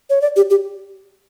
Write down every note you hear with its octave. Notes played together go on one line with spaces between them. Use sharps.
C#5
D5
G4
G4